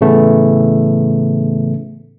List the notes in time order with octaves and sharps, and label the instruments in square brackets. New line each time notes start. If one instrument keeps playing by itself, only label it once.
[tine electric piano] A2 C#3 E3 A3 B3